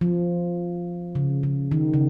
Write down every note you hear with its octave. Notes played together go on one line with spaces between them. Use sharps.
F3
C#3
C#3
D#3
C#3